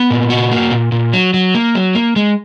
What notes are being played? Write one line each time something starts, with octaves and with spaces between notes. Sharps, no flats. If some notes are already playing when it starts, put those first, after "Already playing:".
Already playing: B3
A#2
F#4
A#3
A#2
A#2
F#3
F#3
A#3
F#3
A#3
G#3